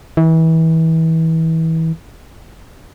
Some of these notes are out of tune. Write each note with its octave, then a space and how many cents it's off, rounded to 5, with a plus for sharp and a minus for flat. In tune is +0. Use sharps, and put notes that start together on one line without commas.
E3 -30